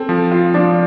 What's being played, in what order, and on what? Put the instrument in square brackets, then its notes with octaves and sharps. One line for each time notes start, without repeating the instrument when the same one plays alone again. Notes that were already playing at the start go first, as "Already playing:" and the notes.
Already playing: [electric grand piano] C4 [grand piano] A4
[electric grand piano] F3
[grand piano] F4
[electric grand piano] F3 [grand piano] D4